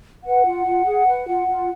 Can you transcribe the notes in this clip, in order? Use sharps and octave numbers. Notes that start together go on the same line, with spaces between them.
B4 F#5
F4
F4
G#4
B4
F4
F4